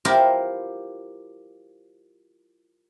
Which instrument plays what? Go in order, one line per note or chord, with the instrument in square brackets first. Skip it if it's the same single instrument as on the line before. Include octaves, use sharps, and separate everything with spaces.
[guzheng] E4 F4 G4 A#4 C5